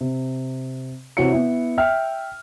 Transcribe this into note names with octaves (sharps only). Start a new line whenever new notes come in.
C3
C3 E3 F#4 C#5 C#7
B3 E4
E5 G5 F6